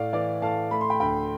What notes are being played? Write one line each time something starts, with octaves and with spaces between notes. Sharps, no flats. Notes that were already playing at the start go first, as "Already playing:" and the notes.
Already playing: A2 D5 F5
E3 D5 F5
A2 F5 A5
A3 B5
C6
G5 B5
D2 G5 B5